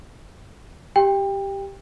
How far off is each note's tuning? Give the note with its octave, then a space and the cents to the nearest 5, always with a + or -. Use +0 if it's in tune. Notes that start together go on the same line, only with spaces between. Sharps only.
G4 +0 G5 +25